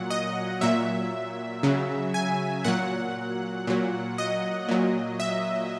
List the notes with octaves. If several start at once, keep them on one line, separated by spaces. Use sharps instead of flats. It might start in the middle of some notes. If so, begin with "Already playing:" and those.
Already playing: A#2 F#3 F#5
D#5
A#2 F#3 E5
C#3 F#3
G#5
A#2 F#3 F#5
A#2 F#3
D#5
A#2 F#3
E5